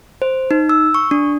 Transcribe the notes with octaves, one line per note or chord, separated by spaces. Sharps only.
C5
D#4
E6
C#6
D4